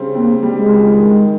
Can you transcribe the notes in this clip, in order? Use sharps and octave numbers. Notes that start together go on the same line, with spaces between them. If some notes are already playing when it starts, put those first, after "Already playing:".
Already playing: C#3 G3 C4
A#3 C4
G3
G#3
C#2
D#3